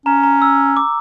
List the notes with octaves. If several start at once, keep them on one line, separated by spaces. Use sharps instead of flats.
C#4 A#5
A#5
E6
D6